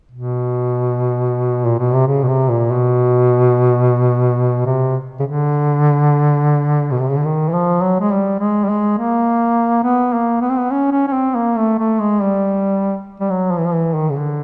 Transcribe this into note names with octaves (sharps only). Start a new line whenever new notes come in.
B2
A#2
B2
C3
C#3
B2
C3
A#2
B2
C3
C#3
D3
B2
C3
C#3
D3
D#3
E3
F3
F#3
G#3
G3
G#3
G3
G#3
A#3
B3
A#3
B3
C4
B3
C#4
C#4
C#4
C4
A#3
A3
A3
G#3
G3
G3
F#3
F3
E3
F3
E3
D#3
C#3
D3